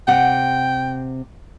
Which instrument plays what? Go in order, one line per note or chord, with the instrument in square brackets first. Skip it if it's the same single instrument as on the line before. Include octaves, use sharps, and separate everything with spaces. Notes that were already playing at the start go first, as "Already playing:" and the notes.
[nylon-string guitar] C3 F#5 [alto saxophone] G5